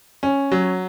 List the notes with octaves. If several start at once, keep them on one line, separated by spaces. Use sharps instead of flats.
C#4
F#3